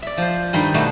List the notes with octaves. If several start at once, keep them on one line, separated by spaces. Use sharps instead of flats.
D5 E5
F3 C5
G2 D#3 G3 D#4 B5 C6
G2 B2 A3 D4 F#4